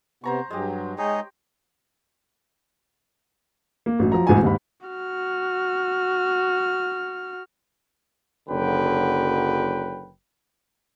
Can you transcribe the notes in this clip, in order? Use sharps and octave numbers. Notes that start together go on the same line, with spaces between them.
C3 B3 C5 A#5 C#6
G2 F#3 G#3 G4
G#3 D#4 G#4 C#5 D#5 G5
A#3
A1 F#2
F3 F#3 A#5
E1 A1 G#2 B2 E4 G#5
D#2 G#2 B5
F#4 F6
F#1 D3 F#3 B4 G5